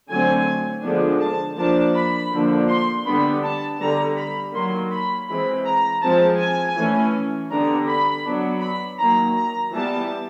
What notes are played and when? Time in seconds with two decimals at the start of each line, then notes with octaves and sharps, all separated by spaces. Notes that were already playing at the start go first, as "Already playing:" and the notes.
0.10 D3 F#3 A3 C4 G#5
0.84 D3 F3 G#3 B3 D4
1.20 A5
1.57 F3 A#3 D4 A5
1.95 B5
2.31 D3 F3 A#3 D4
2.69 C6
3.06 D3 G3 B3 D4 B5
3.43 A5
3.80 D3 G3 B3 A#5
4.17 B5
4.54 D#3 F#3 A#3 C6
4.91 B5
5.28 E3 G#3 C4 B5
5.65 A#5
6.02 F3 G#3 C4 A5
6.40 G#5
6.77 E3 A3 C#4
7.50 D3 G3 B3 D4 A#5
7.88 B5
8.25 F#3 B3 D4
8.61 B5
8.98 D#3 F#3 A#3 A#5
9.36 A#5
9.73 E3 G3 B3 A5